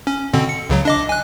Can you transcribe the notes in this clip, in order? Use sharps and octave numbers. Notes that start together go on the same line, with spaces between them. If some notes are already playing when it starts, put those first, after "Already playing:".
C#4
B2 D3 C4
C#7
C#2 C#3 F#3
D4 D#5 D6
G#5 F#6